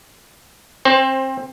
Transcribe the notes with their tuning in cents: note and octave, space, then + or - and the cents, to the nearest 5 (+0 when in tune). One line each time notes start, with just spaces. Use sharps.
C4 +25 C5 +15